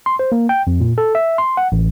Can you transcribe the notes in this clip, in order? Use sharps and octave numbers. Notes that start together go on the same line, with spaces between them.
C6
C5
A#3
G5
F2
A#2
A4
E5
C6
F#5
A1